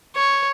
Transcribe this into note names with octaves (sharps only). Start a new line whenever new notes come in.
C#5